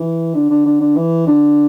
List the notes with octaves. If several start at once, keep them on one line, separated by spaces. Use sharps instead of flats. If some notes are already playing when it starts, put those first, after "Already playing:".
Already playing: E3
D3
D3
D3
D3
E3
D3